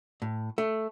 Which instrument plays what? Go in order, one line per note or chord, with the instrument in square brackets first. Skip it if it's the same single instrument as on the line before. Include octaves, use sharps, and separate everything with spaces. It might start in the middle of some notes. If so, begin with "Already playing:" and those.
[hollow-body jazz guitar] A2
A3